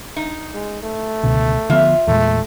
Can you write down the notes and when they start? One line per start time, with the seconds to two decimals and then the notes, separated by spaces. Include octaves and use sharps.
0.16 D#4
0.54 G#3
0.83 A3
1.24 C#2 B2 D3
1.70 D3 F3 B3 F4 E5
2.08 E2 A#2 G#3 A3